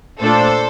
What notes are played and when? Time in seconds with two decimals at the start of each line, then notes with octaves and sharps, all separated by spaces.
0.20 A#2 A3 D4 F4 A4 C5